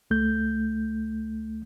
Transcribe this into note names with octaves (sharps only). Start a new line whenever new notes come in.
C#2 A3 G6